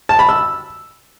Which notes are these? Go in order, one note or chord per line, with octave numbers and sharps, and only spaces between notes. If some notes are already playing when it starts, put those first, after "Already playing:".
A5
B5
E6